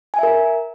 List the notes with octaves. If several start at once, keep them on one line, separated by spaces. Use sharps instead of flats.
A#4 E5 G#5